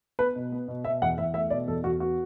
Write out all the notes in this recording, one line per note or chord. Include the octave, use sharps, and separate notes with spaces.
B3 B4
B2
B3
B2
B2 E5
E2 F#5
E2 E5
A3 E5
B2 D5
E2 A4
E2 F#4
B3 F#4